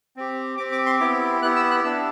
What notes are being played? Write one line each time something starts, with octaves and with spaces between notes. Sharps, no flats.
C4 G4
C4 G4 D6
D6
C6
B3 E4 G4 D6
B3 E4 G4 F#6
E6
F#6
B3 D4 G4 E6